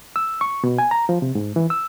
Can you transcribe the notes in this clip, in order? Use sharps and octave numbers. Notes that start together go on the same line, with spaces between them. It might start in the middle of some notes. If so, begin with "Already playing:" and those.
E6
C#6
B2
G#5
A#5
F3
C3
G#2
E3
E6